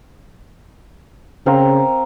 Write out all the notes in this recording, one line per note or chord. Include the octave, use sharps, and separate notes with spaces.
C#3 C4 A#4 F5